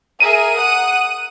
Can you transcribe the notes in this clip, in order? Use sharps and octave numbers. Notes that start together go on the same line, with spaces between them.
G#4 A#4 E5 D#7
F#5 D#6 F#6